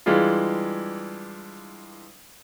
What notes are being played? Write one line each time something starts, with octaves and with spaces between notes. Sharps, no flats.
E3 G3 G#3 D4 F4